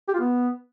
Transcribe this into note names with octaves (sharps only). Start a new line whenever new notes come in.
G4
F4
B3